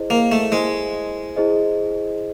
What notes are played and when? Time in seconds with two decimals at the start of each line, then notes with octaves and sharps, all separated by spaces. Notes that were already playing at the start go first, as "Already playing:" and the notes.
Already playing: E4 G#4 C5 D#5
0.10 A#3
0.32 A3
0.52 G#3 E4 G#4 C5 D#5
1.36 E4 G#4 C5 D#5